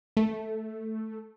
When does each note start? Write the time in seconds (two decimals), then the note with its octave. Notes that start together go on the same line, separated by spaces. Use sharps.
0.17 A3